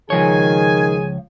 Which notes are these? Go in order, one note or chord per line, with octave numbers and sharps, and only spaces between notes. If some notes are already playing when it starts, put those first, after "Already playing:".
C#2 D#3 F3 G#4 C#5 G#5